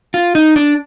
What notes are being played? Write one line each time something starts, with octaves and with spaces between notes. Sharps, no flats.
F4
D#4
D4